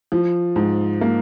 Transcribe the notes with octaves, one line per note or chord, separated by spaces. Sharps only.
F3
G#2
A#3